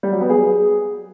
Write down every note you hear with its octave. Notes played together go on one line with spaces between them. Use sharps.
G3
F#3
B3
G#4